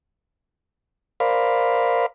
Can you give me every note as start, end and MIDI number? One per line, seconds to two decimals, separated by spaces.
1.20 2.06 70
1.20 2.06 72
1.20 2.06 74
1.20 2.06 77
1.20 2.06 83